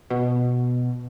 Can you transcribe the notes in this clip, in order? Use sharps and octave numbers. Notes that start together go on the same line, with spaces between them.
B2